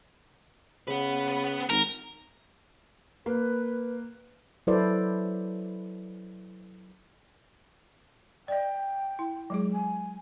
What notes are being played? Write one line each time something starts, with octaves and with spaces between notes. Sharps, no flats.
C#3 B3 B4
G#1 A#4
A#3 B4
F#3 E4 A4 B4 C5 D5
D5 D#5 G5
E4
F#3 G#3 G#4
G#5